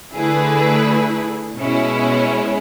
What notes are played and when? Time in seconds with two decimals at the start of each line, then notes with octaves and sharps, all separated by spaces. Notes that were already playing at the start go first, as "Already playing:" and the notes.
0.14 D3 A3 E4 G#4 B4
1.56 B2 G#3 C#4 E4